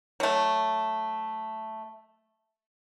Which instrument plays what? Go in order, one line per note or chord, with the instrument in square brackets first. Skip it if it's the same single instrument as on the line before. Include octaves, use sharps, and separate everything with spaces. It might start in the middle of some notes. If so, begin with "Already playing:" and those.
[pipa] F#3 A3